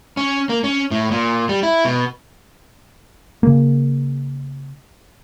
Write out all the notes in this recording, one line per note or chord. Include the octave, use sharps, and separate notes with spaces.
C#4
A#3
C#4
A2
A#2
G3
E4
B2
C#3 A#3